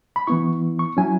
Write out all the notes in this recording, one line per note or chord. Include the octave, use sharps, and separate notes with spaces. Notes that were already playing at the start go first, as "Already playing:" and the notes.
B5
E3 B3 E4 C#6
C#6
F#3 C#4 E4 G#5